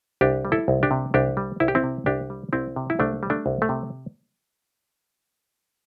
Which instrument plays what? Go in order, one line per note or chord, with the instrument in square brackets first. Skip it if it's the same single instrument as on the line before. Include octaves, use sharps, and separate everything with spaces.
[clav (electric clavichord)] C2 D4 G4
G3
E4 A4
C2
D4 G4
C3
C2 D4 G4
G3
C2 E4
G4
C4 E4
C3
C2 D4 G4
G3
C2 C4 E4
C3
E4
C2 A3 D4
G3
A3 D4
C2
A3
C3